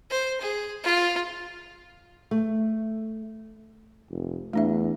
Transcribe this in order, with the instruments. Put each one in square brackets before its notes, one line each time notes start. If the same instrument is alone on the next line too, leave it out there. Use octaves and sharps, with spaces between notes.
[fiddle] C5
G#4
F4
[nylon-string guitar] A3
[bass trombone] F1
[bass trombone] E2 [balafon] A3 D4 E5